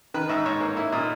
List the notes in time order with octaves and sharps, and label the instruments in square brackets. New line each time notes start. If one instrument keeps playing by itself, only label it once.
[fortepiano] D#3 B4
G#2 E5
G#2 C#5
A#3
A#3 E4
A#2 D#4